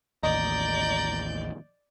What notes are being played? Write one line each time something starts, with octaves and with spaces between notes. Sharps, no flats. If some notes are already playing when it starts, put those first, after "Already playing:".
A1 D#2 D5 D#5 A#5 G6